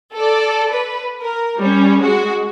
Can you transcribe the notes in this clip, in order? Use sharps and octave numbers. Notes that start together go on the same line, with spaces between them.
A4 D5
B4
A#4
G3 C#4
G#3 F#4